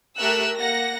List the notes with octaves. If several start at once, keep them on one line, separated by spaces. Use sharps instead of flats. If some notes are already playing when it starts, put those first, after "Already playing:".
A3 G4 A#4 E6 F#6
A#3 F#5 A#6